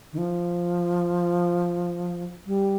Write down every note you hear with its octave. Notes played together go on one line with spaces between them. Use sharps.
D#3
F3
G3